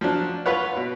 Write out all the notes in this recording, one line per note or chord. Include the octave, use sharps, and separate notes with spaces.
F3 F#3 D4
F4 B4 C#5 F#5
B2